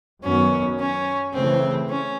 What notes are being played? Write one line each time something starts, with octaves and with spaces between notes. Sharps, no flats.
F#2 D#3 F#3 B3 C#4
C#4
C#3 E3 A3 C4
C#4